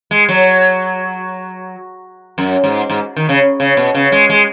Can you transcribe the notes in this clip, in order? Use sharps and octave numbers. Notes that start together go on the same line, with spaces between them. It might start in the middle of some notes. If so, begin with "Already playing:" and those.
G#3
F#3
F#2
G#2
G#2
D#3
C#3
C#3
B2
C#3
G#3
G#3